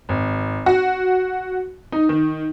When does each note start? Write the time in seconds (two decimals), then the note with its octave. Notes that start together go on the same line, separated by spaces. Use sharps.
0.09 G#1
0.66 F#4
1.92 D#4
2.09 D#3